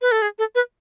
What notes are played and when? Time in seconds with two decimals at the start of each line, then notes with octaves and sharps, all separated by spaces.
0.02 B4
0.12 A4
0.22 G#4
0.39 A4
0.55 B4